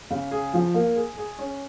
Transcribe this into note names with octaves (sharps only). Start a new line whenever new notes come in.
C#3
G#4
F3
A#3
G#4
G#4
C#4